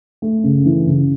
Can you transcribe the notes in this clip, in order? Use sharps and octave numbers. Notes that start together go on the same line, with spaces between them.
A3
C#3
E3
C#3